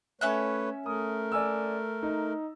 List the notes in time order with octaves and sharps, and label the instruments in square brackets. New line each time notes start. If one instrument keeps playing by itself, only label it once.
[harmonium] A3 B4 C#5 [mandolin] C#4 E5 F#6
[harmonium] A3 A#4 [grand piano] D#6
[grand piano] D5 G#5 E6
D#4